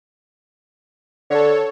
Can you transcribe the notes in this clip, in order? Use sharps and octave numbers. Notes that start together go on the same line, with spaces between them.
D3 A4 C#5